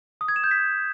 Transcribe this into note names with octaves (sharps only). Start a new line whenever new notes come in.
D#6
G#6
E7
G6
B6